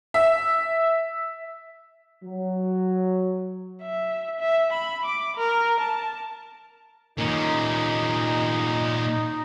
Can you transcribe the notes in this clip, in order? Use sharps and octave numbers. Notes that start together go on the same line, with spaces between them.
E5
F#3
E5
E5
B5
D6
A#4
A5
A#2 C#4 D#4